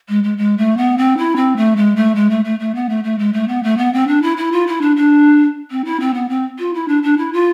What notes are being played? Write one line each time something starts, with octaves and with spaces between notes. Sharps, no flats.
G#3
G#3
G#3
A3
B3
C4
E4
C4
A3
G#3
A3
G#3
A3
A3
A3
B3
A3
A3
G#3
A3
B3
A3
B3
C4
D4
E4
E4
F4
E4
D4
D4
C4
E4
C4
B3
C4
F4
E4
D4
D4
E4
F4